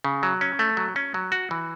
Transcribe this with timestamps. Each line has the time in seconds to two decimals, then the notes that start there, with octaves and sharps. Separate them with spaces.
0.04 C#3
0.23 F#3
0.41 C#4
0.59 A3
0.77 F#3
0.96 C#4
1.14 F#3
1.32 F#4
1.51 E3